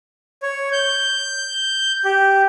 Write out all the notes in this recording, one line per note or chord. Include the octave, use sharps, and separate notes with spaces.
C#5
G6
G4